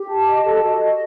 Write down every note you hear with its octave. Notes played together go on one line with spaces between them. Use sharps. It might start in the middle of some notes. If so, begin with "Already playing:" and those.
Already playing: G4
A5
D#5
A4
F#4
D#5